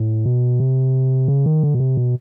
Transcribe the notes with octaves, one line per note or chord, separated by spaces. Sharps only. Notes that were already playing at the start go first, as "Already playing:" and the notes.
Already playing: A2
B2
C3
C#3
D#3
D3
B2
C3
B2